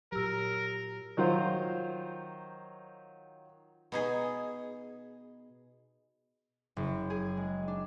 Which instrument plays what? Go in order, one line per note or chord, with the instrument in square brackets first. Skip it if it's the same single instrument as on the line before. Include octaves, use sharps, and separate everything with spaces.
[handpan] A#2 F#3 [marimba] G4 E6 [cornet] A#4
[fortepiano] D#3 F#3 F4 C5
[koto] B2 D#4 G#4
[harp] F#1
G#4
G#3
D4